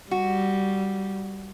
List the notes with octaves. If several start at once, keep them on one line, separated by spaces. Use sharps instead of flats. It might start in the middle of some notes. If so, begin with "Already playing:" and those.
G3 F#4